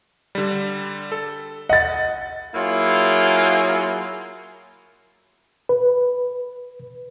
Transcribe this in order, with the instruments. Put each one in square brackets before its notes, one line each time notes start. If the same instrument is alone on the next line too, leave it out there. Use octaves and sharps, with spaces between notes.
[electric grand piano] D3 G3
A4
[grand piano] D#5 A6 [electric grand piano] F#5
[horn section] F#3 A#3 E4 F4 G#4
[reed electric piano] B4